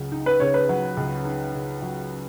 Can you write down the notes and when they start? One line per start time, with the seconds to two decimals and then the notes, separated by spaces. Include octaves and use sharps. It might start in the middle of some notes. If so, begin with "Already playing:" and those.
Already playing: C#2 C#3 F#3
0.12 D#4
0.26 B4
0.40 C#3 C#5
0.54 B4
0.69 F#3
0.97 C#2
1.25 D#4
1.54 C#3
1.82 F#3